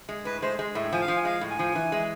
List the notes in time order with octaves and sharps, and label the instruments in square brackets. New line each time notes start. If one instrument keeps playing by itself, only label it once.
[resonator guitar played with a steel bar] G#3
[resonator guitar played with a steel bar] A2 [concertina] B4
[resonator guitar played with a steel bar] G#3 [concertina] C5
[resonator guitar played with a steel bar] G#3
[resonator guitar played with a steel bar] A2 [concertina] E5
[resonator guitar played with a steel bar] F3 [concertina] G#5
[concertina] F5
[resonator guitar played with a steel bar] F3
[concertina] G#5
[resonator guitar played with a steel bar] G#3 [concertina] F5
[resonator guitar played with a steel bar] A2
[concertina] G#5
[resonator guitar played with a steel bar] F3
E3
G#3